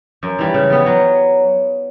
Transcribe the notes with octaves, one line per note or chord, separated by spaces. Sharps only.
F#2
E3 G3
C#3
G3 B3
F#3